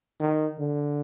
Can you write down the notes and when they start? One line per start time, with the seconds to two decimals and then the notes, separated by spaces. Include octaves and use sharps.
0.20 D#3
0.59 D3